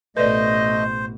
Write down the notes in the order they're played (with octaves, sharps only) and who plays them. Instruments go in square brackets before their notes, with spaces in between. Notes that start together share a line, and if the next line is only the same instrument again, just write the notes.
[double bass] A1 B2 [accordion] A3 D#5 [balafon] B4 D5 [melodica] C5